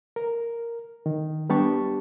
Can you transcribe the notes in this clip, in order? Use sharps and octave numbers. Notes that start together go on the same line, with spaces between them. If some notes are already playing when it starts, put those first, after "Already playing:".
A#4
D#3
G3 B3 D4 G4 A5 C#6